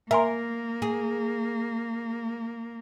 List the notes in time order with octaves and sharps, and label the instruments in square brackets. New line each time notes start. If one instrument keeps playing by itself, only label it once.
[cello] A#3 [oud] A#4 [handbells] E5 G#5 C6
[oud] G#4